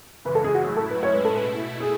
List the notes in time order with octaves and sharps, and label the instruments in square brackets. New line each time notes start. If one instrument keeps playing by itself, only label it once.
[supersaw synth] C#3 E3 G#3 [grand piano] B4
[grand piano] A4
G#4
F#4
[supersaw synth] A2 F#3 A3 E4 [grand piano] G#4
[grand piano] A4
B4
[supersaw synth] A2 G#3 C#4 E4 [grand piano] C#5
[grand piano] B4
A4
B4
[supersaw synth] B2 A3 E4
[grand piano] G#4